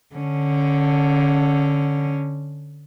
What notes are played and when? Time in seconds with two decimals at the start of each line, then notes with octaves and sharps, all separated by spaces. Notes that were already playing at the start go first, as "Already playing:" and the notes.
0.15 D3 C#4